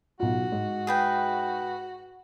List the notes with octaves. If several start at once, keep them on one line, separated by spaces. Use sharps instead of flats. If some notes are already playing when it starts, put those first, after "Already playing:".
B1 F4 F#4
G#2
G#4 B4 G5